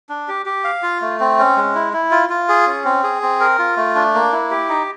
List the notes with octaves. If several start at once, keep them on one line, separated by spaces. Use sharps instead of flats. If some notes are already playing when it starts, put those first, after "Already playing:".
D4
G4
G4
F5
F4
A3
C4
C#4
G#3
E4
E4
F4
F4
G#4
C#4
C4
G#4
C4
A#4
F4
A3
D4
A#3
E4
G4
D#4